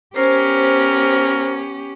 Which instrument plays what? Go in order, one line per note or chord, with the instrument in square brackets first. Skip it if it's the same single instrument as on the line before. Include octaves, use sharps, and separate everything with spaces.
[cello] B3 G4 [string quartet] C#4 [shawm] A#4 [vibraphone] C5